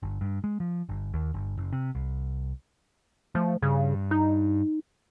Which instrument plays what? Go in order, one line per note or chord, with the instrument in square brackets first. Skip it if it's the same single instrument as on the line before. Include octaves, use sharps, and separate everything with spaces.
[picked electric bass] G1
G2
G#3
F3
G1
D#2
G1
F#1
C3
C2
[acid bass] F3 [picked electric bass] A3
[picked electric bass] G2 [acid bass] C#3
[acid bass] D#4